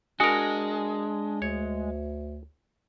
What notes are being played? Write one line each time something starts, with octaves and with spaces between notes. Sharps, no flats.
G#3 D4 F#4 A#4 G#5 D#6
D2 C#5